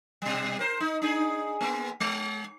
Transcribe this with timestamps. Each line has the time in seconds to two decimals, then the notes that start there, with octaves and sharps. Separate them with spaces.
0.22 B2 G3
0.59 A#4 C5
0.80 D#4
1.02 D4 D#4 G#4
1.61 A#3 B3
2.00 G#3